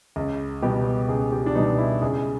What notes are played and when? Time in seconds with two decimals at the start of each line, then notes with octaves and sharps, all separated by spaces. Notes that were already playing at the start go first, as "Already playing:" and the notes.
0.16 C#2
0.62 B2 G3 B3 G4
1.09 C#2 G#4
1.32 G4
1.46 D4
1.55 B2 G3 B3 D#4
1.78 E4
2.02 C#2 G#4